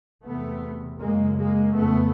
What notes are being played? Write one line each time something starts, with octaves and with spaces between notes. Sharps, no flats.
E2 C3 A3 B3
F#2 C#3 G#3 A#3
G#3 A#3
F2 C#3 A3 B3